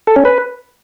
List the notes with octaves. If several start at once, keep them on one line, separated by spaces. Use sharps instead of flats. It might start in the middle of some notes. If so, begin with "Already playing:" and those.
A4
C#4
B4